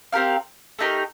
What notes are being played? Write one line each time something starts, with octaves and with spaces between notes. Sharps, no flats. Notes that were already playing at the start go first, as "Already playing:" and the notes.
C4 G4 A#4 F5
A3 D#4 G4 A#4